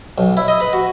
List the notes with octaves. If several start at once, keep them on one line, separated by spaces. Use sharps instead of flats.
B1
E4
D#5
B4
F#4